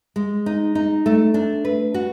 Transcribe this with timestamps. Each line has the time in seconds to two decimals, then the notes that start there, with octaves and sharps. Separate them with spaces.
0.16 G#3
0.46 D#4
0.75 D#4
1.06 A3
1.34 D4
1.65 B4
1.94 F#4